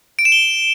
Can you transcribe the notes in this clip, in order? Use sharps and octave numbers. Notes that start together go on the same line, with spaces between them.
D7
E7
G7